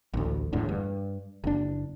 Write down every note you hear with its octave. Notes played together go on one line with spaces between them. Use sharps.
A1 D2
E1 E2 A2 D3
G2
F#1 D4